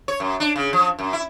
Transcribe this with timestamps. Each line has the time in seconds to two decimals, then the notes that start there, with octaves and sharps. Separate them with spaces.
0.08 C#5
0.20 F#2
0.40 D4
0.56 C#3
0.73 F3
0.99 F#2
1.13 E4